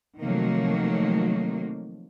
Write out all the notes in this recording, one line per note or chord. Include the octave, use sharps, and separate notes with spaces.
C3 D#3 F3 F#3 A3 A#3